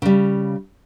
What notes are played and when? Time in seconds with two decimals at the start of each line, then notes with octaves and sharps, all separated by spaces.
0.02 C#3 G3